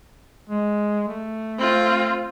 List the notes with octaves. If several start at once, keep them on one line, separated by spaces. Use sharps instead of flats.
G#3
A3
C4 F4